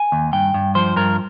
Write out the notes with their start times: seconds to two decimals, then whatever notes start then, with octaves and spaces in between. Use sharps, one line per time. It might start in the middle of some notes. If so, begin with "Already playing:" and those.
Already playing: G#5
0.12 D#2
0.33 G2 G5
0.54 G2
0.75 F3 C5
0.96 G2 A#4